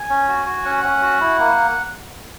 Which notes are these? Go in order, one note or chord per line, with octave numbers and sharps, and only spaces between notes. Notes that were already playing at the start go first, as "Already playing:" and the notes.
Already playing: G#5
C#4
F#4
F#4
C#4 F#5
C#4
F#4
E4
A#3